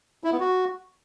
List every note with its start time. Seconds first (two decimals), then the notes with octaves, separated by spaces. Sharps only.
0.24 E4
0.32 B3
0.40 F#4